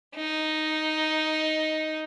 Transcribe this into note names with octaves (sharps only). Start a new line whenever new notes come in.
D#4